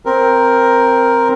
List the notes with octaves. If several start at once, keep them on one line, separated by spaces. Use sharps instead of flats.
C4 A#4